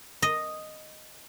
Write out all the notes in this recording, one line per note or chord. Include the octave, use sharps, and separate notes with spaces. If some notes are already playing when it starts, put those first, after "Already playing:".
D#5